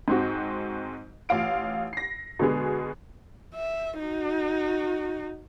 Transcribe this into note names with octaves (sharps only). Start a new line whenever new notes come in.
G#2 C4 F#4
A1 F4 F5 D7
A#6 C7
B2 D3 G#3 B3 G#4
E5
D#4 F#4